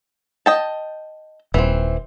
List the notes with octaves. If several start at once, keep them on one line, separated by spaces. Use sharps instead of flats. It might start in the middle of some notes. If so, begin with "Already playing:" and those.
D#5 G5 A5
D#1 E3 C4